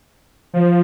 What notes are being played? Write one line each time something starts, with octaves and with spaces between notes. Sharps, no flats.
F3